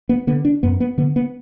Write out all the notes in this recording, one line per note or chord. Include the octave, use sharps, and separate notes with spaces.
B3
D3 B3
D4
F#2 B3
B3
D3 B3
B3